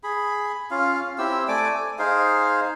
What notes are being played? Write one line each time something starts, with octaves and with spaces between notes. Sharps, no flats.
G#4 B5
C#4 F4 F5
C4 E4 G4 E6
A3 D5 G#5 D6
G#5
D#4 G#4 C5 F5